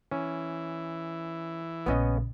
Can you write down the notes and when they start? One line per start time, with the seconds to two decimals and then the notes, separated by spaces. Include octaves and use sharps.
0.12 E3 C#4
1.86 A#1 C#3 B3 C#4 D#5